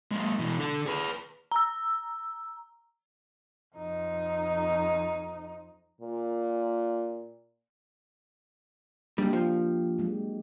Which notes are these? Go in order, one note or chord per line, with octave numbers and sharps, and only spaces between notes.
G#3 A#3
B2 E3
D3 A4
G#4 B4
A#5 E6
F2 D#4
A#2
C#2 G3 A#3 D4 G4
F3
F#3 G#3